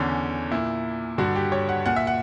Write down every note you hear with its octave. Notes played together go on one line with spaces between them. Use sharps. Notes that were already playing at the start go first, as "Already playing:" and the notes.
Already playing: E2 D3 C#4
A#2 E4
G2 D3 F#4
G4
C#5
F#5
A#2 F#5
E5
F#5